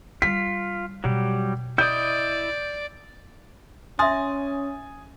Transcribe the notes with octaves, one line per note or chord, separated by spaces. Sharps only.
G3 D4 F4 B6
B2 F#3 G3 G4
E4 D5 D#5 D#6 G6
C#4 E5 G#5 C6 D#6 A6